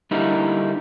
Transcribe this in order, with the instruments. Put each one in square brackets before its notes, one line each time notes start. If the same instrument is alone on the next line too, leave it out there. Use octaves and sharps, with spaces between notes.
[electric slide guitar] D3 G3 A#3 D#4 E4